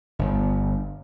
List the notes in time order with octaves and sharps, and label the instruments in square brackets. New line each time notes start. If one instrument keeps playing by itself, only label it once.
[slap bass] G1